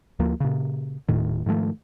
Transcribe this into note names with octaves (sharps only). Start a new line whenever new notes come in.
D2 F3 A#3
A#2 C#3
D#1 A2 D#3
G#2 D#3 F3 A3